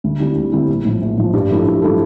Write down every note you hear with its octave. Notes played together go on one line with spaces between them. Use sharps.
D2
D3 G3 C4 E4
D2
D3 G3 C4 E4
A#1
A2 F3
A#1
A2 F3
G2
F3 A3 E4 A4
G2
F3 A3 E4 A4